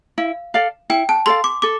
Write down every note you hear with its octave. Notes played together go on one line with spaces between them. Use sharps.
E4 F5
A4 D5 F5
E4 G5
A5
A4 D5 F5 C6
D6
A4 D6